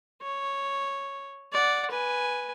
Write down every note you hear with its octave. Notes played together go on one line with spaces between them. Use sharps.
C#5
D5 F#5
B4 G#5